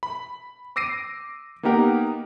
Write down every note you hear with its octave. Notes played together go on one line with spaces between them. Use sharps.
B5
D6 E6 A#6 C7 D7 D#7
A#3 B3 D#4 G4 A#4 F#5